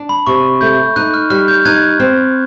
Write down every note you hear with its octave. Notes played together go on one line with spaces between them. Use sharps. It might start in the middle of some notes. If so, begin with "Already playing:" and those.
Already playing: D4
B5
C3 C#6
A3 G6
D#4 F#6
F6
G3 F6
G6
D#4 F#6 G#6
C4